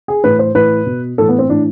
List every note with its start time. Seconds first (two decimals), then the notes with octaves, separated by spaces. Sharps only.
0.08 G#4
0.23 A2 E3 B4
0.39 C5
0.54 A2 E3 B4
0.86 B2
1.18 A2 E3 A4
1.29 B3
1.39 C4
1.49 A2 E3 D4